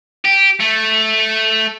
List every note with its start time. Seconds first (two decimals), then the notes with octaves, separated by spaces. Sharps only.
0.25 G4
0.60 A3